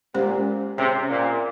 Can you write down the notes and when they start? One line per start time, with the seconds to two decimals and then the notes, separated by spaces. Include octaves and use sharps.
0.14 A#2 G#3 C#4 G4 C5
0.78 C3 C#4 G#4 C#5
1.10 A#2